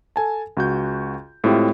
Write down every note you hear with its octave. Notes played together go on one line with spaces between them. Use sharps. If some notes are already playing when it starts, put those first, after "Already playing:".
A4 G#5 A5
C#2 F#4 G6
A2 G#3 C4 E4 F4 G4